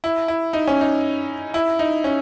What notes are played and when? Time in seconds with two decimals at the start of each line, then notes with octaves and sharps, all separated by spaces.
0.04 E4
0.28 E4
0.53 D#4
0.68 C#4
0.81 D#4
1.54 E4
1.79 D#4
2.04 C#4